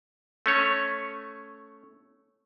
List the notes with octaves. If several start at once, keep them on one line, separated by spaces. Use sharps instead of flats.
A3 C#4 C#5